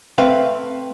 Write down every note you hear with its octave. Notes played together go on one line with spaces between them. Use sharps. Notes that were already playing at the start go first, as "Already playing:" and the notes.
A3 C4 B4 E5 F5